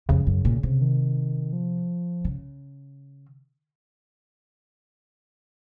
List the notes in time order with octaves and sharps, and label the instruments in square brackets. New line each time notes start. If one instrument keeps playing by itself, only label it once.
[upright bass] F2 [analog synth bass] C#3
[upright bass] F#2
A#2
C3
[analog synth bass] D#3
F3
[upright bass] C#3